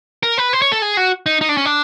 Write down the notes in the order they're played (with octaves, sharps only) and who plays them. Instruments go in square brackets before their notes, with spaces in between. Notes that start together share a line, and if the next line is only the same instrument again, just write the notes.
[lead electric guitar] A#4
B4
C5
C#5
A4
G#4
F#4
D#4
D#4
D4
C#4
D4